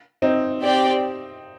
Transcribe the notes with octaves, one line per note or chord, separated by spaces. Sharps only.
C4 D#4
C4 G4 D5 G5